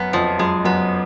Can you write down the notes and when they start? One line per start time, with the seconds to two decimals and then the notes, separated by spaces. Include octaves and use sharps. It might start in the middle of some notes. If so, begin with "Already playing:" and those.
Already playing: F#2 B3
0.13 F2 F3
0.39 F#2 G#3
0.65 F#2 B3